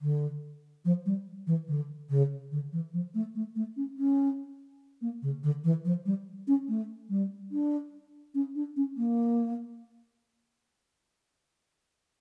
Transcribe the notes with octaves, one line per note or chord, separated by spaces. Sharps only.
D3
F3
G3
E3
D3
C#3
D3
E3
F3
A3
A3
A3
C#4
C#4
A#3
C#3
D3
E3
F3
G3
C#4
A3
G3
D4
C#4
D4
C#4
A#3